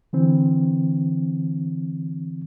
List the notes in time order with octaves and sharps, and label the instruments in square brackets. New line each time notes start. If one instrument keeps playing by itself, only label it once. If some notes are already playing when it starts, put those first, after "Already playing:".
[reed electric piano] D3 E3 C4